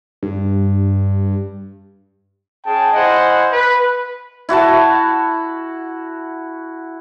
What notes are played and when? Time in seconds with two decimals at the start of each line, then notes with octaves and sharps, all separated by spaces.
0.22 G2
2.65 C#4 G#4 G5 A5
2.93 E4 C5 D#5 F#5 G#5
3.52 B4
4.49 E4 F#4 F#5 A5